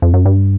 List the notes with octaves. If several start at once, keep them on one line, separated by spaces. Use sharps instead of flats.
F2
F#2
G2